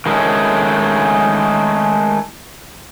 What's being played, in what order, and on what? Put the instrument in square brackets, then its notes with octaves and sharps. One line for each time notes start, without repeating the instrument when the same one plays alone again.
[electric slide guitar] D#3 G#3 A3 C#4